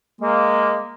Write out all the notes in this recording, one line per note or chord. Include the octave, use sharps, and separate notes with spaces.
G#3 A#3